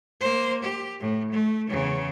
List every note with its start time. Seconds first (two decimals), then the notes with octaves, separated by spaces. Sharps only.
0.20 A#3 C5
0.63 G4
1.00 A2
1.32 A3
1.68 E2 C#3